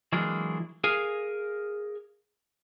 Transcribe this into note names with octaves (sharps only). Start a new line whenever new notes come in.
E3 F#3 G#3 A#3 D4
G#4 A#4 F5 G#5